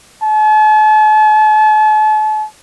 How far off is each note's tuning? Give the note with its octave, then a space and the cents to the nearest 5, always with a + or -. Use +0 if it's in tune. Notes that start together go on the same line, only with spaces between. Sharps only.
A5 -40